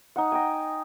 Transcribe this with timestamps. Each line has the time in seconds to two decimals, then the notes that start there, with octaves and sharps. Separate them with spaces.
0.16 D#4 F#5
0.32 D#5 G5 G#5